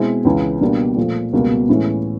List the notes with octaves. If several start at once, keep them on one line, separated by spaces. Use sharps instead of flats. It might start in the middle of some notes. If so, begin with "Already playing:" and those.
Already playing: B2 G#3 C4 E4
C#2 C#3 E3
B2 G3 A#3 D4
A#2 F3 A3
C#2 B2 G3 A#3
A2 E3 G#3 C#4 E4